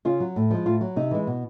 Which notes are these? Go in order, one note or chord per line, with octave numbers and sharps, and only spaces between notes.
C#3 F4
F#3
A2
F3 G#3
A2 F4
F#3
C3 D#4
E3 G#3
B2